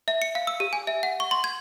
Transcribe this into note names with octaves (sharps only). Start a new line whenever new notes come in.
E5
C#7
F5
E6
G4
G#5
E5
F#5
C#6
C6
G#6